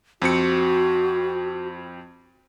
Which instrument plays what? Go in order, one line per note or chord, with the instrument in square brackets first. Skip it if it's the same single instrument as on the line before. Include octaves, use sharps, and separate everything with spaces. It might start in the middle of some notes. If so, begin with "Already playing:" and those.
[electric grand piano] F2 C4 C#7 [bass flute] F#4